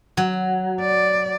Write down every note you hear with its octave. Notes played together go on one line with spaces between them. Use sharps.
F#3
D5